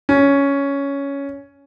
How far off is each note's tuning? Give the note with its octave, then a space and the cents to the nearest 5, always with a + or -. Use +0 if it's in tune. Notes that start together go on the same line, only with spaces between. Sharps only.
C#4 +10